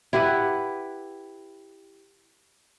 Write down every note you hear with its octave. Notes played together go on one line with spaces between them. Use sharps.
E4 G4 B4 F#5